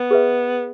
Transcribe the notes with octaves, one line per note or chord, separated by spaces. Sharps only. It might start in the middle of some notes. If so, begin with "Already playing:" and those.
Already playing: B3
G#4 B4 E5